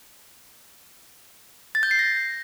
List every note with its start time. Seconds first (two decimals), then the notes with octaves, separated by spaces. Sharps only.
1.75 A6
1.83 G6
1.91 C7
1.99 A#6